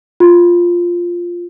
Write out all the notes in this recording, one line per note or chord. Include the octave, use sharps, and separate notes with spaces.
F4